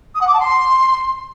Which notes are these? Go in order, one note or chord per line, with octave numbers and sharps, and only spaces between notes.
D#6
F#5
D6
A5
C6